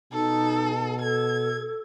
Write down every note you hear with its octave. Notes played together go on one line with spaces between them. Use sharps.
B2 D#4 A4
A4 G#6